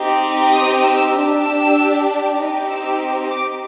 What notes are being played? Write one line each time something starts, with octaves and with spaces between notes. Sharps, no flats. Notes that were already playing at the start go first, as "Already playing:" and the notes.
Already playing: C4 D#4 G4
D#6
E6
D4 G4
E6
C4 D#4 G4
E6
D6